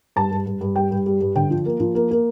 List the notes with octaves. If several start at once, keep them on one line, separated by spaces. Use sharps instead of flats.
G2 A5
G2
G2
G2
G3 G5
G2
G3
G2
D3 G5
F3
A#3
F3
A#3
A#3